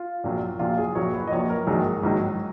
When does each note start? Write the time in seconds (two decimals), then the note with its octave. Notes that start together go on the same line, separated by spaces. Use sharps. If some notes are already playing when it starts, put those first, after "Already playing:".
Already playing: F4
0.24 A#1 A#2 F#3
0.59 A#1 A#2 F#3 F4
0.78 G#4
0.95 A#1 A#2 F#3 C#5
1.14 B4
1.27 D#5
1.31 A#1 A#2 F#3 C#5
1.49 A#4
1.67 A#1 G#2 D#3 F#3 G#4
2.03 A#1 G#2 D#3 F#3